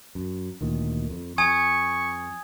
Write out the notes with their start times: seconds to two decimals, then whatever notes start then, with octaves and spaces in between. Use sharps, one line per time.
0.15 F#2
0.61 D2 A#2 D#3
1.10 F2
1.38 F2 G#5 C#6 D#6 G#6